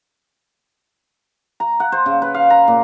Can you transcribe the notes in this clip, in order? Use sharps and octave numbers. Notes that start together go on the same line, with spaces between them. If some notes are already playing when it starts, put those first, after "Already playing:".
A#5
F#5
C5
C#3
B4
F5
A#5
A#2